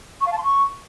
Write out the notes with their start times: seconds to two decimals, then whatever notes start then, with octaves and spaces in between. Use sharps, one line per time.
0.21 C#6
0.26 F5
0.32 A5
0.38 C6
0.44 C#6